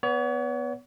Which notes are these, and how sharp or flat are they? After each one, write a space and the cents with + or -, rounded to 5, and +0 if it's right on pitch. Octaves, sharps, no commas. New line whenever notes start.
B3 +0 C#5 +40